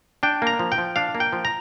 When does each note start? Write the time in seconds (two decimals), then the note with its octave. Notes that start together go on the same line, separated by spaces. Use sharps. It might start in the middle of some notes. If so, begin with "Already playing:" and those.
0.23 D4 G5
0.42 A#3 A#5
0.59 F3
0.72 G5
0.78 F3
0.96 D4 F5
1.15 A#3
1.20 G5
1.33 F3
1.45 A#5